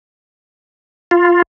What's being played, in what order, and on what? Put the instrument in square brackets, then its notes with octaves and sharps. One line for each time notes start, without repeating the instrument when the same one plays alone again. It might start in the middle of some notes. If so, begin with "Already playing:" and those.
[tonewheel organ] F4